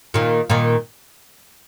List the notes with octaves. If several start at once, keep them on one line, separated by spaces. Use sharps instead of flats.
A#2 D#3
A#2 D#3